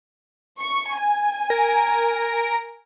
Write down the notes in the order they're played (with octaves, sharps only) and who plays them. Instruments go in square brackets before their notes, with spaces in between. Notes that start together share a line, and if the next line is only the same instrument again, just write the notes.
[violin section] C#6
G#5
[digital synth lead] A#4